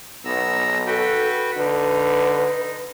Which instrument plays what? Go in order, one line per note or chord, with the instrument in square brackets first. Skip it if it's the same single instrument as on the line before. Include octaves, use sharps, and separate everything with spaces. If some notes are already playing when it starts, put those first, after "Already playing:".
[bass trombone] B1 [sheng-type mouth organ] B3 A#5 E6
[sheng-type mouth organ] F#4 B4 G5 [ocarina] A4
[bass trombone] D3 [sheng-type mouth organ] D#4 [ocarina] B4